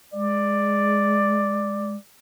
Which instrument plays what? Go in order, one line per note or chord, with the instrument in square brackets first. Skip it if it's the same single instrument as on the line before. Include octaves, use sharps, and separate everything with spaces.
[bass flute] G#3 [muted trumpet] D5